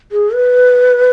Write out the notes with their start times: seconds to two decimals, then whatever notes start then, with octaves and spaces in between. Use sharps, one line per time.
0.12 G#4
0.34 B4